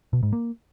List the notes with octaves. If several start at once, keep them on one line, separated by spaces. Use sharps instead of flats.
B2
G#2
A#3